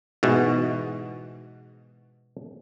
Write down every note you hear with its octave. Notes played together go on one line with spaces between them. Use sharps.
G#2 B2 E3 F#4